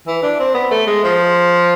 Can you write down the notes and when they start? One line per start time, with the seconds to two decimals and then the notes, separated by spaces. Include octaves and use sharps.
0.07 E3
0.23 D4
0.39 C4
0.55 B3
0.71 A3
0.87 G#3
1.04 F3